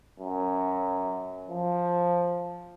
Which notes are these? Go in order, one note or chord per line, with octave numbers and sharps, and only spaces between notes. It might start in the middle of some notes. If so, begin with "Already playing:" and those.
F#2
F3